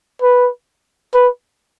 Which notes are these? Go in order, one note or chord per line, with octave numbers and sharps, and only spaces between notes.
B4
B4